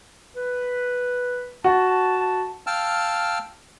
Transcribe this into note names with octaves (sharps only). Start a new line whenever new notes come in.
B4
F#4 A5
F5 G5 A5 E6 F6